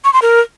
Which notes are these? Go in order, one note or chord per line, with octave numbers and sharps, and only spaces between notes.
C#6
C6
A#4